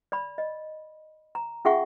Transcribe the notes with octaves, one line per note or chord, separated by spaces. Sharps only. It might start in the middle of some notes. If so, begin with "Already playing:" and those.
D5 B5
D#5
A#5
C#4 F4 G#4 E5 F#5 C#6